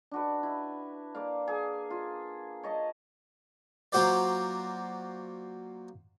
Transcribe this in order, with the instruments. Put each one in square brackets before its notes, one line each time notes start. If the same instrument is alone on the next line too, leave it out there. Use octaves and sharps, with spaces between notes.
[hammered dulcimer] D4 F#4 B4
E4
A#3 D5 F5
G#4
F4
C#5 D#5 A5
[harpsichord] F#3 A#3 F4 F#4 C5 D5